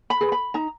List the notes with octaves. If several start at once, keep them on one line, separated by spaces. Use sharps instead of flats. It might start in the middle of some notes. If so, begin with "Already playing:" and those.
B5
G#4 B4
B5
D#4 A#5